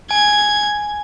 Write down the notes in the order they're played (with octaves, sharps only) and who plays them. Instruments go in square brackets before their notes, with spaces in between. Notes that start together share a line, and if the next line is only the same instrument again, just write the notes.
[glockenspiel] G#5 [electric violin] G#6